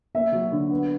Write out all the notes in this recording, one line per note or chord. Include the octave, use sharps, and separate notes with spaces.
A#3 E5
F#3
D3
B3